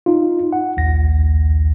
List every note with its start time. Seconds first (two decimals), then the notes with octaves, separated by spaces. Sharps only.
0.06 D#4 F4
0.53 F#5
0.77 A#1 D#2 A#6